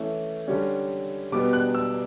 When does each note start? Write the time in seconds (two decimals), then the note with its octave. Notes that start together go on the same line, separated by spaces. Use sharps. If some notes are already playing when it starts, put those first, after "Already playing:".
Already playing: E3 A3 C#4
0.48 D3 G3 C#4
1.32 B2 G3 B3 D6
1.53 F#6
1.75 E6